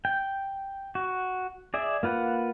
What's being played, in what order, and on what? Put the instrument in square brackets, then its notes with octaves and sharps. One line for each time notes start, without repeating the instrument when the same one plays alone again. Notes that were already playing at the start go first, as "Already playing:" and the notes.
[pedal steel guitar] G5
F#4
G#4 D5 E5
A#3 F4 B4 F#5